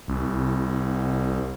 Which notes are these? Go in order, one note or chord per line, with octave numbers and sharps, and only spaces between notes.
C2